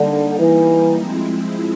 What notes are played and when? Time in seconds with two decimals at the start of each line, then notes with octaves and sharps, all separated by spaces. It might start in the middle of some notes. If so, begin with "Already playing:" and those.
Already playing: D3 G3 A#3 D#4
0.39 E3
0.95 F3 G#3 C4 E4